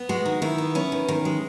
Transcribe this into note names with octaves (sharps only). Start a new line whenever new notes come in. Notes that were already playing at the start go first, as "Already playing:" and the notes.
Already playing: B3
G#3 F#4
D#3
D#3 E4
B3
B3 C#4
D#3
D#3
G#3